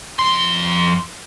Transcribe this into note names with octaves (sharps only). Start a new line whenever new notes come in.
F2 C6